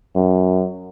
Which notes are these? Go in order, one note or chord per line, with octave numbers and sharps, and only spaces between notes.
F#2